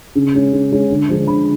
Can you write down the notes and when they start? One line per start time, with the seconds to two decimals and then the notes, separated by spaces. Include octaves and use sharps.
0.15 C#3
0.34 G#3 C#4
0.53 C#3
0.72 G#3 C#4
0.90 D3
1.09 F3 G#3 D4
1.27 D3 B5